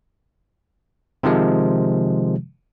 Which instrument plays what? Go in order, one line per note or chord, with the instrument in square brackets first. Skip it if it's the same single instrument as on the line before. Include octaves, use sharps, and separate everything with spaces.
[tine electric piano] C3 D#3 F3 G#3